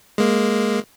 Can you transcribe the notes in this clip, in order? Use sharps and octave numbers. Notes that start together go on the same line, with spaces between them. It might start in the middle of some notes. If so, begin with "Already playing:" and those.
G#3 A#3